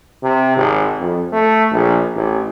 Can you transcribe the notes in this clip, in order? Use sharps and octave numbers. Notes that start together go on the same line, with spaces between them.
C3
G#1
F2
A3
A#1
A1